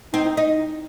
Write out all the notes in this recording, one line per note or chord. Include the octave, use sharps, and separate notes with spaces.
C4 D#4
D#4